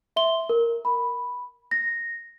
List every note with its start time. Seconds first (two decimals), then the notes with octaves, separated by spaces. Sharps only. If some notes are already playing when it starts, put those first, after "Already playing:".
0.16 E5 C6 G7
0.49 A#4
0.85 B5
1.71 A#6